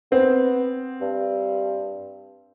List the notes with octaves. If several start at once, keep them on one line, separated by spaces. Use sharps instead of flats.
B3 C4
G2